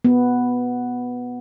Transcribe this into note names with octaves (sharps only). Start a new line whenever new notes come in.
B3